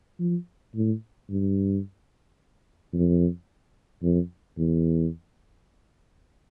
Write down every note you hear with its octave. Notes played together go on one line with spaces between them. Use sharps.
F3
A2
G2
F2
F2
E2